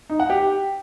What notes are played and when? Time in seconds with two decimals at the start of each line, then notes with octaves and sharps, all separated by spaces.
0.10 D#4
0.20 F#5
0.30 G4